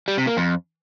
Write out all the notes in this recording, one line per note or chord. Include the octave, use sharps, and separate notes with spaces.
G3
C3
A#3
F2